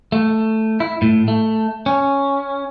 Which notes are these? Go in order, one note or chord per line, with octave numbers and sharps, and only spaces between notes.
A3
E4
A2
A3
C#4